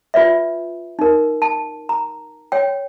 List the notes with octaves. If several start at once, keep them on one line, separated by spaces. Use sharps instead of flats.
F4 B4 D5 E5
D#4 A#4
A5
A#5
C#5 G5